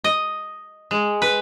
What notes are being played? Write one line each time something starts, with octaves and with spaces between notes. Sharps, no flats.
D#5
G#3
B4